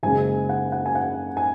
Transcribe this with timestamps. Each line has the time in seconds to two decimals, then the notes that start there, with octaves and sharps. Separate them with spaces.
0.03 F#1 F#2 C#3 G#3 G#5
0.49 F#5
0.72 F#5
0.86 G#5
0.95 F#5
1.37 G#5